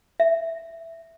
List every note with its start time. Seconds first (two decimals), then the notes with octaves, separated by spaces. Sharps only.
0.20 E5